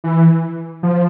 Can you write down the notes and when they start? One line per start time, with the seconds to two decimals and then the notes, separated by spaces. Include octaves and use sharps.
0.04 E3
0.83 F3